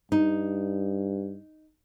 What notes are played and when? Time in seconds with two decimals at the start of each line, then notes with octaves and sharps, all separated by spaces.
0.12 G2 D#4